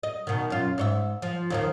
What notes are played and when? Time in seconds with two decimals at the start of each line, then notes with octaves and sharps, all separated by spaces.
0.03 D#5
0.27 B2 D#3
0.50 F#2 F4
0.78 G#2 C#5 E5
1.22 F3
1.50 D#2 D#3 F3